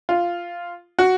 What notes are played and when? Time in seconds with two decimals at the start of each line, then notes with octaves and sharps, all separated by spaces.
0.09 F4
0.99 F#4